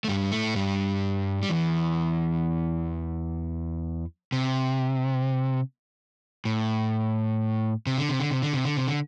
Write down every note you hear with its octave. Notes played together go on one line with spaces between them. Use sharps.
A3
G2 G3
A2 A3
G2 G3
G3
E2 E3
C3
A2
C3
D3
C3
D3
C3
D3
C3
D3
C3
D3